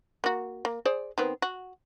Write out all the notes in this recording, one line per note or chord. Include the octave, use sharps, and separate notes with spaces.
A#3 F#4
A#3
G#4 C5 D5
D#3 B3 C4
F#4